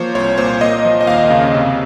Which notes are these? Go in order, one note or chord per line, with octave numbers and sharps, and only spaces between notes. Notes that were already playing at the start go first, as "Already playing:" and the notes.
Already playing: F3 A#3 C5 C#5
C2 C#5
A#2 C5
A#3 D#5
F3
D#5
D#2 F5
C#3
C3